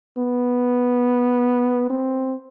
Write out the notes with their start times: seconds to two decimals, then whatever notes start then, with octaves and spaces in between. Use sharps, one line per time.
0.18 B3
1.90 C4